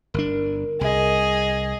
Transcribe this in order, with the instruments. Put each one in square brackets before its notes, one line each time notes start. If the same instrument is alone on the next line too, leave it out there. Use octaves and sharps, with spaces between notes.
[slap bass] G1 D4 [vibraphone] A#4
[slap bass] C2 [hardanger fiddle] G#4 D#5